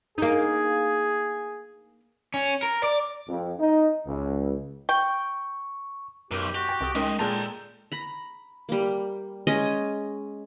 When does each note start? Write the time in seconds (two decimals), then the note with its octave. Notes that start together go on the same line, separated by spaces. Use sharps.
0.18 A#3 D#4 G#4
2.34 C#4
2.63 A#4
2.83 D5
3.29 F2
3.60 D#4
4.06 C#2
4.89 G5 C#6
6.31 B1 F#2 G4 A#4 D6
6.55 F#4 G4
6.69 G5
6.81 C2 A4 D#6
6.95 G#3 C#4 D#4 A#4 D#5
7.19 A#2 G#3 A4 G5 A5 A#5
7.92 A#5 B5
8.69 G3 A#3
9.47 G#3 C#4 D#5